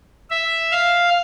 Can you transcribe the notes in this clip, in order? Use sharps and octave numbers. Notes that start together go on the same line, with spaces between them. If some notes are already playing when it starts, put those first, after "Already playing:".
E5
F5